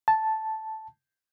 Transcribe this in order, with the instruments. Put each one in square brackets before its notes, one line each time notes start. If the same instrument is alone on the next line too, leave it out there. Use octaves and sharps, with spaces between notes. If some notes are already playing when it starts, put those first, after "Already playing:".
[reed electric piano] A5